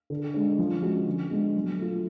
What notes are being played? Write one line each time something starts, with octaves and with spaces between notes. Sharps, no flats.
D3
G#3 D4
F3
G#3 C#4 F#4
D3
G#3 B3 D4
F#3
A3 F4